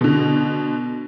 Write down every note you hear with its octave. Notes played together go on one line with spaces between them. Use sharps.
B2 D3